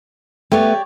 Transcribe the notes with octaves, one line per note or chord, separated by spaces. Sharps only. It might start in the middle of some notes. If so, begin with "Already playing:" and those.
A3 B3 G4 C#5 D5